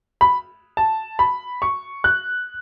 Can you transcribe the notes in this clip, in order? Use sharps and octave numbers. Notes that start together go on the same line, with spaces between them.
B5
A5
B5
C#6
F#6